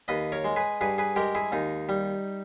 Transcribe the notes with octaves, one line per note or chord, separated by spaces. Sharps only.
D#2 B4 D#5
A#4 C#5
G#3
G#4 B4
G2 G#4 B4
G#4 B4
G#3 G4 A#4
E4 G#4
D#2 D#4
G3